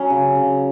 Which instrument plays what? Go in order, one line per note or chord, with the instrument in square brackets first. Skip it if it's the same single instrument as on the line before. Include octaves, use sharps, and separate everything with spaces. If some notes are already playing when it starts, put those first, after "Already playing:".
Already playing: [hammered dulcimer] F#3 C#4
C#3
C#3